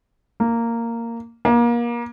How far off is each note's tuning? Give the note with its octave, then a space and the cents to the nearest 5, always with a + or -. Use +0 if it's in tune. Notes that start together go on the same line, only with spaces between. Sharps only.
A#3 -10
A#3 +30